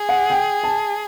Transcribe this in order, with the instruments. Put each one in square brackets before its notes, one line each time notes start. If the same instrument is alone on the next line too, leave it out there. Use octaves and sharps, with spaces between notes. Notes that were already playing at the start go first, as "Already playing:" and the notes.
Already playing: [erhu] G#4
[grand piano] F#5
G5
A5